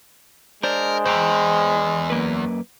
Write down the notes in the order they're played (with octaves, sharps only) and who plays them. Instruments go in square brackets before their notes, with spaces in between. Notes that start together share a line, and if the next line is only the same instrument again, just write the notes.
[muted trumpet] G#3 [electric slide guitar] D4 C5 D5 [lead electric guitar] A#4
[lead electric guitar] E2 [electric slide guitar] C5 G5 A#5
[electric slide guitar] F#2 A#3 B4